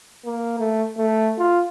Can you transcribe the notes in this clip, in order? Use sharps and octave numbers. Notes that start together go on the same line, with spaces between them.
A#3
A3
A3
F4